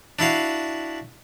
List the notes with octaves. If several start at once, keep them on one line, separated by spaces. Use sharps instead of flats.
D4 E4 F#4 F5